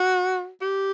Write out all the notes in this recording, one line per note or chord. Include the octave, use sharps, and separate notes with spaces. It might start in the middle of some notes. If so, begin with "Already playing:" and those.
Already playing: F#4
G4